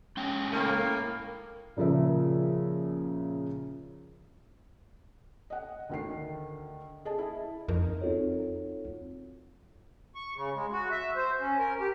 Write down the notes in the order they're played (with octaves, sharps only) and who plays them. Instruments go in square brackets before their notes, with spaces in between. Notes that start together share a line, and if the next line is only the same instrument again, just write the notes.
[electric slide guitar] G#3 C#4 G5
[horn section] A2 A#3
[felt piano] A#2 C#3 F3 A#4 E5
D#5 F#5
D2 D#3 C7
G#4 D#5 A5
E4
[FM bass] F2 [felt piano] D#4 A#4
[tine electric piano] C4 D#4 F4 F#4 A4 C#5
[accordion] C#6
C#3
G#3
F#4
E5
C5
C#4
A#4
G4